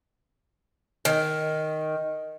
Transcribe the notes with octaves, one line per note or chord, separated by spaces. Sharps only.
D#3